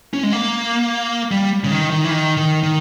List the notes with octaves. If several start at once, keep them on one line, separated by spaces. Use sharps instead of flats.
C#4
G#3
A#3
G3
C#3
D#3
D#3
E3
D#3
D#3
D#3